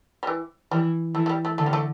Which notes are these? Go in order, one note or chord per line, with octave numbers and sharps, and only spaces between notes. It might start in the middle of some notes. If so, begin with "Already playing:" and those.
G3
E3
E3 G3
E3 A3
A3
G3
A3
D3 A3
G3
A3